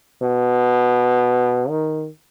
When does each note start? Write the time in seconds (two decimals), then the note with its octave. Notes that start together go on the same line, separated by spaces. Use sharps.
0.22 B2
1.69 D#3